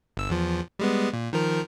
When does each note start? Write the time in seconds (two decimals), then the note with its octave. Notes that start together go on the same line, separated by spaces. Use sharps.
0.17 G1 E6
0.30 E2 F3
0.79 G3 G#3 B3
1.13 A#2
1.33 D#3 F3 A#4